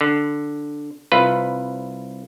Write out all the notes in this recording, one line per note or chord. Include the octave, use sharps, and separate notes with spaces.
D3
C2 F4 B4